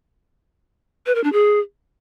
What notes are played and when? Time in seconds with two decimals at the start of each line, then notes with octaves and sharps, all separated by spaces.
1.06 B4
1.15 A#4
1.24 D4
1.32 G#4